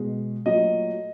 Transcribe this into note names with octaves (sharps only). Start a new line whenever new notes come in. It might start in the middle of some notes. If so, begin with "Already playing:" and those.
Already playing: B2 G#3
A#2 F#3 A3 D#5